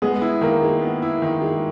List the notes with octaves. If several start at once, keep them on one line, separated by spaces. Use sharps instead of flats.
G#3 B3 G#4
E4
D#3 A#3 A#4
G#3
B3
E4
D#3
G#3